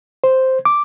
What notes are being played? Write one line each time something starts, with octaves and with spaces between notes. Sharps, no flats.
C5
D6